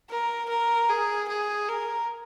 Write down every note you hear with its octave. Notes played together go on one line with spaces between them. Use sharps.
A#4
A#4
G#4
G#4
A#4